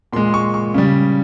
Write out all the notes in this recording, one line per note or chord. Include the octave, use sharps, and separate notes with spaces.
A#2 G#3 C6
C#6
C#6
C#3 G3